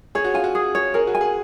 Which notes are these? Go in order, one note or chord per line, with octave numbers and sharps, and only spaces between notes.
G#4 C#5
F#4
F4 G#5
F#4
G#4
C#5
G#4 A#4
F#4
G#5
G#4